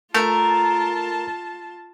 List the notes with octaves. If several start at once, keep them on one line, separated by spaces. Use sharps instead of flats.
A3 F4 A#4 A5